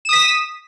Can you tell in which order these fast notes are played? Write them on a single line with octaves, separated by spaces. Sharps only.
E7 D#6 B6